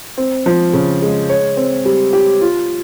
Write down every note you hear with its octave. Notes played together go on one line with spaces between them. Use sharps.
C4
F3
C#3
G#3
C#5
C4
G3
G4
F4